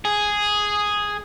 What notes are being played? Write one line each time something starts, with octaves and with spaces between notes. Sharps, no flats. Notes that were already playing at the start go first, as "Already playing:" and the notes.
G#4